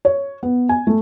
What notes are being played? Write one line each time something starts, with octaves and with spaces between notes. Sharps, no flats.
C#5
B3
G#5
A3